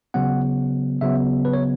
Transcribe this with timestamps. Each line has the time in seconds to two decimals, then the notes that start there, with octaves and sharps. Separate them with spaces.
0.14 C#3 F#3 B3 F#5
1.01 C#3 F#3 B3 E5
1.45 B4
1.53 C#5